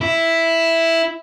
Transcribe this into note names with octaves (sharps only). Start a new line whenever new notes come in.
E4